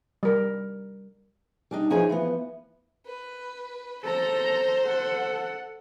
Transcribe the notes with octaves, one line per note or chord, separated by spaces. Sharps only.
G3 A#4
G3 D4 D#4
E2 F3 D#4 G#4 C#5 G#5
E3 F3 B3
B4
A4 C5 A#5
A4 F#5